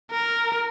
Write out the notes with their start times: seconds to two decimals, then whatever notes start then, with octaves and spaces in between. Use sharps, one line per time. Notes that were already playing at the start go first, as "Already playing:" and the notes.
0.11 A#4